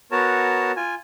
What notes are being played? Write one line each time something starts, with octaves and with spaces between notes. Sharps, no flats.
B3 F#4 A#4 C#5 A5
F4 G#5